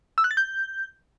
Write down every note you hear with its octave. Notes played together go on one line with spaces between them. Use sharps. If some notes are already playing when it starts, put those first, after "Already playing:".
E6
F#6
A6
G6